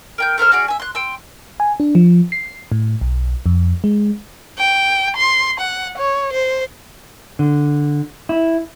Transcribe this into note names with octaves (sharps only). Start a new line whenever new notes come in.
A#4 G5 G6
A3 A#4 C5 F6
C#4 F#4 G#4 D5
E5 G#5
C6 F#6
G5 C6 E6
G#5
D4
F3
C7
A2
B1
F2
G#3
G5
C6
F#5
C#5
C5
D3
E4